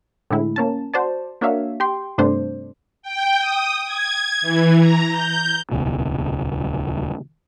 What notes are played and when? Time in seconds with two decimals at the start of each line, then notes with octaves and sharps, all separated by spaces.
0.31 A2 D3 G#3 E4
0.56 A#3 C#4 A5
0.94 F#4 C5 D5 A5
1.41 A#3 D4 F#4 C#5 E5 F5
1.80 G4 G5 C6
2.18 G2 C3 A3 D4 C5
3.02 G5
3.39 D#6
3.85 G#6
4.42 E3
4.80 A#5
5.10 G6
5.71 D#1 C#2 B2